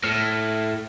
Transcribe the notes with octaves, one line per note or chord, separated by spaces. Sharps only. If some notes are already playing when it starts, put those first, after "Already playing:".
A2 F6